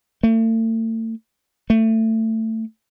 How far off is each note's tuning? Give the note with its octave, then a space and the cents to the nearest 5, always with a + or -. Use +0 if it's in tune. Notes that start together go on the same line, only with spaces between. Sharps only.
A3 +40
A3 +20